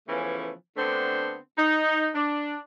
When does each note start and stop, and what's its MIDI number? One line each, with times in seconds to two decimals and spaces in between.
0.08 0.51 49
0.08 0.51 52
0.08 0.51 53
0.08 0.51 57
0.08 0.51 59
0.08 0.51 61
0.77 1.36 50
0.77 1.36 57
0.77 1.36 59
0.77 1.36 60
0.77 1.36 62
1.57 2.08 63
2.15 2.56 62